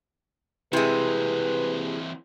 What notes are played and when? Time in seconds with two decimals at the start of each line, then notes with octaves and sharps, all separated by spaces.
0.73 C3 E3 G#3 C4 E4 G#4 B4